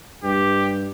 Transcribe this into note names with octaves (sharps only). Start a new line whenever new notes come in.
G2 G4